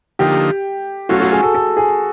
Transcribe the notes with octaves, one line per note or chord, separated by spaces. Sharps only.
D3 F3 A#3 D#4 G4
F#3 A3 C#4 F4 F#4
F#4
G#4
A4
A4
G#4